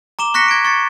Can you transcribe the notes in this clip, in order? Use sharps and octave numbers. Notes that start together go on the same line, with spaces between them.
A#5 D6 E7 G7
C#6 F#6 A#6 B6 C#7
G#6 D7
C#6 A6 C#7